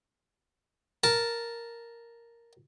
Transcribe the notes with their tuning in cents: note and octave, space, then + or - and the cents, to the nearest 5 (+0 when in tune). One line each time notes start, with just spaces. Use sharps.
A#4 +0 A5 +0